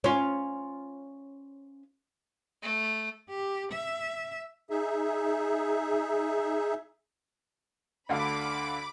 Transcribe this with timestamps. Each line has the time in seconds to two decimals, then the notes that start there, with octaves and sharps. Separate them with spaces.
0.04 C#4 F4
2.63 A3
3.30 G4
3.72 E5
4.70 D#4 G#4 E5
8.09 D2 D3 F5 B5 D6